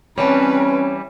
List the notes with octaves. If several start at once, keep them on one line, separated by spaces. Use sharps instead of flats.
E3 G3 C4 C#4 B4 C#5 A5